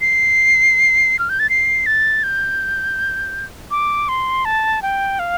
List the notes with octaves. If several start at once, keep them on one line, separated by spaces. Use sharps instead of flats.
C7
F6
G6
A6
C7
A6
G6
D6
C6
A5
G5
F5